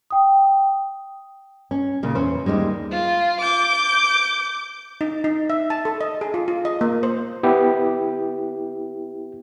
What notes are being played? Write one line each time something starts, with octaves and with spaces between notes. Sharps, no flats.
G5 D#6
C#4
A#2 C#3
E2 C#4 C5
D#2 G#2 G3 G#3
F4
D6 G6
D#4
D#4
E5
A5
A4
D#5
G#4
F4
F4
D#5
A#3
C5
B3 E4 G4